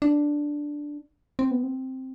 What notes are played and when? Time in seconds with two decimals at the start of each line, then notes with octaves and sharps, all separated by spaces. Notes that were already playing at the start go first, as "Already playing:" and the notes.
0.02 D4
1.39 C4
1.51 B3
1.63 C4